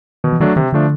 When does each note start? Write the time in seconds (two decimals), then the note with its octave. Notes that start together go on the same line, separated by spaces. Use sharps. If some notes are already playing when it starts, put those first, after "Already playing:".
0.24 B2 D#3
0.32 E3
0.40 D#3 F#3 A3 D4
0.56 C3 D#3
0.73 D3 F3 A3 D4